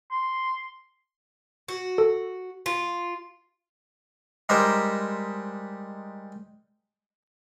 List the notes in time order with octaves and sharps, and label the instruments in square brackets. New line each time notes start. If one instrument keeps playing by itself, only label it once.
[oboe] C6
[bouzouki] F#4
[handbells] A4
[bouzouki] F4
[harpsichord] G3 G#3 D#4 G4 A#4 C5